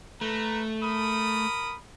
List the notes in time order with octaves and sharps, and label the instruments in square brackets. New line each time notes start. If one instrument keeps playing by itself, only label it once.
[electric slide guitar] A3 [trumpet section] B4 A#5
[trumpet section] A#4 B5 D#6